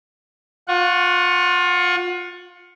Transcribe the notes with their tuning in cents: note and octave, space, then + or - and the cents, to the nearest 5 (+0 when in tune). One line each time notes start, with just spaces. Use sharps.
F4 +25 F#5 +0 C#6 +0